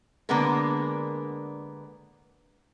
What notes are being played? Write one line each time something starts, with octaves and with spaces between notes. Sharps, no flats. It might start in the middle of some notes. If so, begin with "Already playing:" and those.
D3 G#3 A#3 B3 D4 A#4